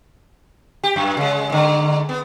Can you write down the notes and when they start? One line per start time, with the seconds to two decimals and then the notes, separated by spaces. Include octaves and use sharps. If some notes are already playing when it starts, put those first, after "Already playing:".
0.84 G4
0.96 F#2
1.17 C#3 G#3
1.50 G#2 D3
2.09 B3